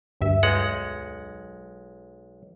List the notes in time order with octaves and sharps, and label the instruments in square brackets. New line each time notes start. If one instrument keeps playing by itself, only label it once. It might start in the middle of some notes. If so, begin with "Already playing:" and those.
[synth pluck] D2 G2 E5
[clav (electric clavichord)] B1 G#3 F#5